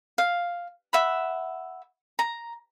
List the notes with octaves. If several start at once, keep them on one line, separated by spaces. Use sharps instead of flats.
F5
E5 F#5 B5
A#5